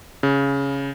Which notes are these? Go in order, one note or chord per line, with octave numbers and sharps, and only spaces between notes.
C#3